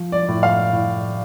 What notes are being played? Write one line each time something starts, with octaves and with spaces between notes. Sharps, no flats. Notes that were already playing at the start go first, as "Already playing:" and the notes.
Already playing: F3
D5
A2
F5
A2